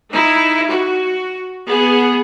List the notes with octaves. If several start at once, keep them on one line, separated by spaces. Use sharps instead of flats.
D#4 E4
F#4
B3 G#4